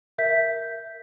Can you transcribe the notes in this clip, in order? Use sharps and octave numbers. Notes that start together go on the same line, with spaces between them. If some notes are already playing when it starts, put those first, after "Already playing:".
A#4 E5 G6 B6